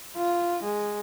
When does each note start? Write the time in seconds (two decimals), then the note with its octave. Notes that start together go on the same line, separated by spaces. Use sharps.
0.16 F4
0.62 G#3